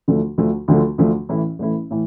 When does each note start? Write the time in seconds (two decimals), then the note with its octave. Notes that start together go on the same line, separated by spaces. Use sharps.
0.08 D2 D3 F3 A3
0.38 D2 D3 F3 A3
0.68 D2 D3 F3 A3
0.98 D2 D3 F3 A3
1.29 A1 A2 E3 A3 E4
1.59 A1 A2 E3 A3 E4
1.91 A2 E3